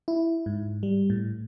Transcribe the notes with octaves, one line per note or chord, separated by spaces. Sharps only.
E4
G#2
G3
A2